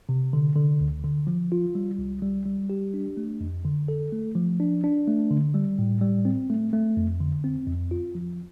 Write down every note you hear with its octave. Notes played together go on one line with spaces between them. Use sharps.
C3
D3
D3
D2
D3
F3
F4
G3
C2
G3
G3
G4
D4
A3
F2
D3
A4
A3
F3
D4
D4
A3
D3
G3
A2
G3
C4
A3
A3
F2
D3
C4
F2
F4
F3